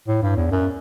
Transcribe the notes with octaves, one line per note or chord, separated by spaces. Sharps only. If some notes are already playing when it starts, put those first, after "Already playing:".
A2
G2
E2
F#2